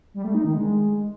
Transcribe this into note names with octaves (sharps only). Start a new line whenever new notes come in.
G3
A3
D#4
D#3
G#3